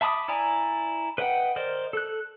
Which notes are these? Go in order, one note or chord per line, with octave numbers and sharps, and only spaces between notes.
E5 A5 B5 D6 D#6
E4 D5 G#5 A#5
B4 D#5 E5 F#5 G5
A#4 C5 D5 D#5
A4 F#6